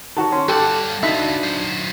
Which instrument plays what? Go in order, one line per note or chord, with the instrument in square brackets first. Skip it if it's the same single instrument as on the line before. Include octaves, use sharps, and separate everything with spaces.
[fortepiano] D#3 F#4 [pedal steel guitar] A4 C#5
[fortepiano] C#4 [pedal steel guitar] C6
[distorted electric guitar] G3 F#5 [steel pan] G4 [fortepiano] A4 [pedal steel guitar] F5
[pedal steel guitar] D4 F#4 B5 [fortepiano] D#4 [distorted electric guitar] F4 B4 [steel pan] E5
[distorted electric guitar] F#3 C5